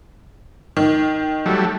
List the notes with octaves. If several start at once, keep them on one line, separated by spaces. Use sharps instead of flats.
D#3
F#3 G3 A3